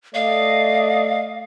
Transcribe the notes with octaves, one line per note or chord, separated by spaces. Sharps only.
A3 D5 D#5 F5